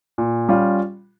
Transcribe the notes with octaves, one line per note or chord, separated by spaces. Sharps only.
A#2
G3 C#4 F4